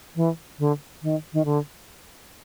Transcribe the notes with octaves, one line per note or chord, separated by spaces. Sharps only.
E3
D3
D#3
D#3
D3